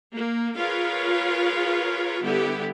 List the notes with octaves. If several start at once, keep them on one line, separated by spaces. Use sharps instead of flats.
A#3
F4 G#4 A#4 B4 C#5 F5
D3 G3 B3 E4 G4